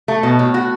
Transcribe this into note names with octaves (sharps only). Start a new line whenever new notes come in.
A3
B2
A2
F#4